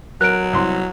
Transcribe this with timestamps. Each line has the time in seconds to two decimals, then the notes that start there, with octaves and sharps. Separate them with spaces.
0.21 F#3 A#4 F#6 D7
0.53 C2 C6